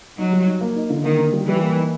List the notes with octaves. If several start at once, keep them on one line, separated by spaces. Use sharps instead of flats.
F#3 D#4
G3
D#4
A#3
D#4
D3
D#3 A#3
D3
G3
E3 G3
A#3
D#4